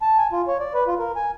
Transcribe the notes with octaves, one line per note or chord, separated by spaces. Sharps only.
A5
G#5
F4
C#5
D5
B4
F4
A#4
G#5